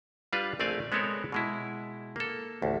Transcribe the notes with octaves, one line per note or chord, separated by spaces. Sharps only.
G3 D4 F4 B4 F5
A#1 A3 C4 D5 F5 G#5
G#3 B3 C4 A4 A#4 C#5
B2 G#3 E4
A#3 A4
A1 D2